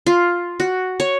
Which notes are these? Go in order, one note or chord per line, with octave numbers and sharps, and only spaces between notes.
F4
F#4
C#5